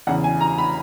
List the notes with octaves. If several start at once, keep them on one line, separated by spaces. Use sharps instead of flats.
E2 C#3 E3 F#5
G#5
A#5
B5